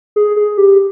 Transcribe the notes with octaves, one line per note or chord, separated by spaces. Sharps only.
G#4
G#4
G4